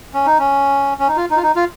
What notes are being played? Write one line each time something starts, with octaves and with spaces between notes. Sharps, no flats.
C#4
D#4
C#4
C#4
D#4
F4
D#4
F4
D#4
F4